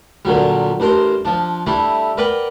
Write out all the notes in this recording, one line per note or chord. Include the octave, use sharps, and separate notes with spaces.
A#2 D3 F#3 G3
A1 D4 A#4 C5 C6
F3 D4
G3 A3 D4 E4
A#4 B4 D5 F#5 G5